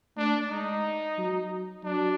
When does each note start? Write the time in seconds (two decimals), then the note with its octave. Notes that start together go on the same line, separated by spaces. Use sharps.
0.17 A3 D4
0.50 G#3 D#4
1.18 F#3
1.84 F#3 D4